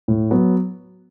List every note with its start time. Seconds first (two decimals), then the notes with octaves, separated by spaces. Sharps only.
0.08 A2
0.31 F#3 B3